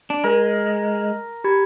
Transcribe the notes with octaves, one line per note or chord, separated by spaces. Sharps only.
D4
G#3 A#4
G4 B5 G#6